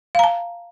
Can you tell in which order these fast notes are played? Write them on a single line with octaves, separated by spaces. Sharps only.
F5 A#5 A5